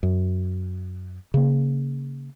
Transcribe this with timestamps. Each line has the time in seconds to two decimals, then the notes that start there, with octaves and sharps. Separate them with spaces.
0.03 F#2
1.34 C#3 A#3